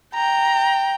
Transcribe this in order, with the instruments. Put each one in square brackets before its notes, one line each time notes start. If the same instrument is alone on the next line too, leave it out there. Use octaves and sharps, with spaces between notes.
[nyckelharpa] G5 [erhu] A#5